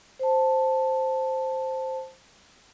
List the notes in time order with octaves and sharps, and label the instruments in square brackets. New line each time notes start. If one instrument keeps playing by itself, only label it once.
[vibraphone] C5 A5